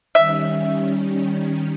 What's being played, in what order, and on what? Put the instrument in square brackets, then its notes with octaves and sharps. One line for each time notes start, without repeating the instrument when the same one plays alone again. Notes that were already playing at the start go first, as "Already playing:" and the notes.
[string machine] D#3 G3 C#4 [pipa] E5